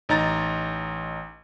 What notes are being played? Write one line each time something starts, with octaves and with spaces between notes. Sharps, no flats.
A1 D#4 A#5 A6